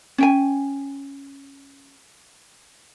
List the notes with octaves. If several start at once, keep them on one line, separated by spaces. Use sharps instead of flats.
C#4 G5 G#5